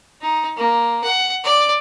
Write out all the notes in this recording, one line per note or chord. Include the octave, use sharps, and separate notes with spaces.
D#4
A#3
F#5
D5